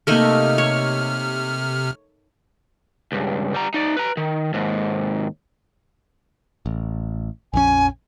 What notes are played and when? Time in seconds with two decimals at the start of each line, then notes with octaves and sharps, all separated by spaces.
0.07 C3 A3 A#3 D#4 F6
0.58 C#5
3.12 C#2 G2
3.54 G3 A#5
3.74 D#4 D5
3.97 B4 A#5
4.17 D#3
4.54 D#2 G#2
6.66 A1
7.53 A#1 F2 C#4 G#5